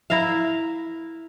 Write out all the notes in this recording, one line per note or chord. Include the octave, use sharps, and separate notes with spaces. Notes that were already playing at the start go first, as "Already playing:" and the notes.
E4 A#4 E5 F5